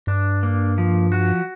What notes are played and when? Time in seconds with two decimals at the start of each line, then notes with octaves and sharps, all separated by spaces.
0.07 G2 D4
0.43 A#3
0.78 F3
1.12 F#4